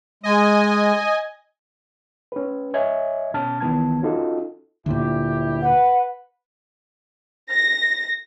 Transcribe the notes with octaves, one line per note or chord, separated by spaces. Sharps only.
G#3 D#5 G#5
C#4 B4
C#5 D#5 E5 G#5 G#6
B2 C#4 A5 F6 A6
C2 D#3 E3 B3 A5 G#6
C#4 D#4 F4 F#4 A4 D#5
G1 D2 A#2 E4 G4
B4 F#5
A#6